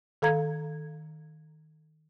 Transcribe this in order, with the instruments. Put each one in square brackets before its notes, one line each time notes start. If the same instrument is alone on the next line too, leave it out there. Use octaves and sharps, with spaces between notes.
[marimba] D#3 A4 F5 A#5 G#6